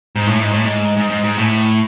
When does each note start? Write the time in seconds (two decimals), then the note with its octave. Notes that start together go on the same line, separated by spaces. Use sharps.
0.15 G#2
0.27 A2
0.40 G#2
0.51 A2
0.64 G#2
0.97 G#2
1.10 G#2
1.24 G#2
1.38 A2